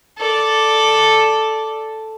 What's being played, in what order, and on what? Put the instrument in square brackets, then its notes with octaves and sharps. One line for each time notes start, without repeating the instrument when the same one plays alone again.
[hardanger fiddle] A4 D5